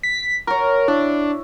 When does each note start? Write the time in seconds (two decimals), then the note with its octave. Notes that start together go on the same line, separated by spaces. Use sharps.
0.03 B6
0.47 F#4 A#4 C#5
0.88 D4 E4